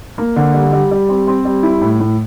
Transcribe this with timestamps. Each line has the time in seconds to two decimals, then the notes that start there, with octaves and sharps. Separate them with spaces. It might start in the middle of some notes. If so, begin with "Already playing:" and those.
0.18 A#3
0.36 D3
0.54 G3
0.72 G3
0.91 G3
1.09 C4
1.27 C4
1.45 G3
1.63 E4
1.81 A2
2.00 A2